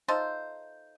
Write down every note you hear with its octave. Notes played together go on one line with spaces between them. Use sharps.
D#4 F4 A4 C5